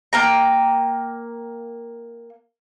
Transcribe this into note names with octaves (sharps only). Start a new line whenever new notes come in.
A#3 G5 A#5